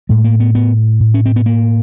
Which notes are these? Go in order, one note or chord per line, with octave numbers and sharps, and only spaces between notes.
A2 G#3
A#3
B3
B3
A2
C#4
C4
B3
A#3